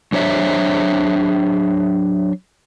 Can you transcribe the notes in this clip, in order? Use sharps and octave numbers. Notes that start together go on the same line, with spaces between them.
F#3 D4 C5 C#5 E5